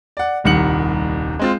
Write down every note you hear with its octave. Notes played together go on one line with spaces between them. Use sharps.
D5 F#5
D#1 C2 D#3 F#5 C#7 F#7
G#3 C4 F4